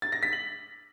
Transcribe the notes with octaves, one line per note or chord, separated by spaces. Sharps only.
A6
A#6
B6
F#7